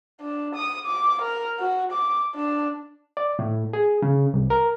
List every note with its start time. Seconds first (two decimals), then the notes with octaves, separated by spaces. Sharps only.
0.21 D4
0.55 D#6
0.86 D6
1.22 A#4
1.60 F#4
1.92 D6
2.35 D4
3.17 D5
3.39 A2
3.73 G#4
4.02 C#3
4.34 C2
4.50 A#4